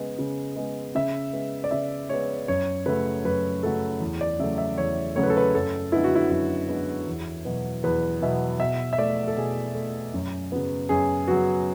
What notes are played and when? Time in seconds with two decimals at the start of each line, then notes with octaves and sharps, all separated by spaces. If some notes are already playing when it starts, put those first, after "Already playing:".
Already playing: C#3 G#3 B3
0.19 C#3
0.56 G#3 B3
0.95 C#3 E5
1.33 G#3 B3
1.64 D5
1.71 C#3 E5
2.09 G#3 B3 C#5
2.48 F#2 C#5
2.86 C#3 F#3 A3 B4
3.24 F#2 B4
3.63 C#3 F#3 A3 A4
4.01 E2
4.21 D5
4.39 C#3 F#3 A3 E5
4.58 E5
4.78 E2 C#5
5.15 C#3 F#3 A3 C#5
5.23 B4
5.30 A4
5.37 B4
5.54 F#2 A4
5.92 D3 G#3 B3 E4
6.04 F#4
6.15 E4
6.30 F#2 E4
6.69 D3 G#3 B3
7.08 E2
7.45 B2 F#3 B3
7.84 E2 B4
8.21 B2 F#3 B3 E5
8.60 B2 E5
8.93 E5
8.98 A3 D5
9.28 A4
9.37 B2 G#4
9.75 A3
10.14 F#2
10.52 C#3 F#3 B3
10.89 F#2 G#4
11.28 C#3 F#3 B3 F#4